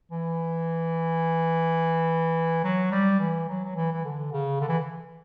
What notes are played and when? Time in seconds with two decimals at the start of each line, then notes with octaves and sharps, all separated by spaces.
0.11 E3
2.64 F#3
2.91 G3
3.20 E3
3.48 F#3
3.65 F#3
3.75 E3
3.93 E3
4.05 D3
4.32 C#3
4.61 D3
4.68 E3